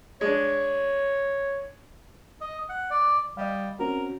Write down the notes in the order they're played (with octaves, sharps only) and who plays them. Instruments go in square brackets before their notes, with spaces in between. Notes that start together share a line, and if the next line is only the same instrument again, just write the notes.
[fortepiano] G#3 D4 [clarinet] C#5
[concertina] D#5
F#5
D5
[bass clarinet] G3 [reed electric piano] D#5 F5
[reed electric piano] C4 C#4 F#4 [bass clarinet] A#4